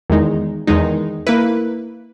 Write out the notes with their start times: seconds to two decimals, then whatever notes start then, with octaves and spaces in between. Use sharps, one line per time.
0.10 E2 D#3 G#3 D#4
0.67 E2 D#3 G#3 D#4
1.27 A#3 E4 B4